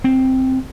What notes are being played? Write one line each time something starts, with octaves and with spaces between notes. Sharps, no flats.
C4